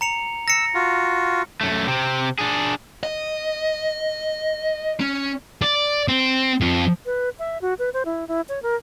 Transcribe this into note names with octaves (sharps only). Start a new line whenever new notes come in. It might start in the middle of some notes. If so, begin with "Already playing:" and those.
A#5 C#7 F7
E6 A#6 C#7
F4 F#4
F#2 A3
C3 C4
D4 G#4
D#5
C#4
D5
C4
F2
B4
E5
F#4
B4
C5
E4
E4
C#5
A#4